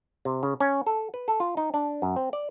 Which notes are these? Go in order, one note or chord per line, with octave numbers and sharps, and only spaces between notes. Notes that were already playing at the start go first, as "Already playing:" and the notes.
C3
C#3
C#4
A4
B4
A4
F4
D#4
D4
F#2
C4
D5